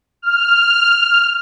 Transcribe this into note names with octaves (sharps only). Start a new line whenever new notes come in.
F6